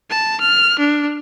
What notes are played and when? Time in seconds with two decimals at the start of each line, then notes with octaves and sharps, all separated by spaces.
0.10 A5
0.40 F6
0.79 D4